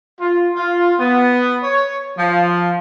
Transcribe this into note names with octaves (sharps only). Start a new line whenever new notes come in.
F4
F4
B3
C#5
F3